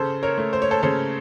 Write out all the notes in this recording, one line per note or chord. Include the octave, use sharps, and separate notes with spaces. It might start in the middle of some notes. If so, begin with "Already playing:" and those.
Already playing: C#3 A4 C5
A#4 C#5
A3
C5
C#5
A4 C5
C#3 A4 C5